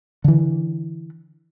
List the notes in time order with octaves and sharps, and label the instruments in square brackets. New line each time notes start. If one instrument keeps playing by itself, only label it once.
[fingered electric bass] D3 E3